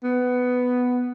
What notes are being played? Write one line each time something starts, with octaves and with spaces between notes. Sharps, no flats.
B3